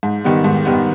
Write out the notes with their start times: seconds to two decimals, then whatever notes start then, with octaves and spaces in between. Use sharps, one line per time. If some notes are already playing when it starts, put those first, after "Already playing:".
0.03 G#2
0.24 D#3 G3 B3
0.44 G#2
0.65 D#3 G3 B3